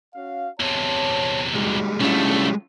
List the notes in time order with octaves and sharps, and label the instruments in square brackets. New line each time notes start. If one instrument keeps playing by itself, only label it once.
[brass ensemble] C#4 F#4 F5
[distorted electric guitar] E2 C3 [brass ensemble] C#5 A5
[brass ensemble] C#3 D#4 F#4 [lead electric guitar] G3 G#3
[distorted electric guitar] C2 A3 [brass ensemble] D3 [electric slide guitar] C#4 E4 F4